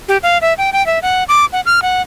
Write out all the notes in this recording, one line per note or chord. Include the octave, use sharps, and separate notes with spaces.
G4
F5
E5
G5
G5
E5
F#5
D6
F#5
F6
F#5